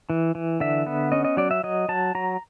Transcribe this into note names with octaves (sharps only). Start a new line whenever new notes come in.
E3
E3
D3 E5
B3
C#4 D#5
D#5
F#3 D5
E5
F#3 D#5
F#3 A5
F#3 A#5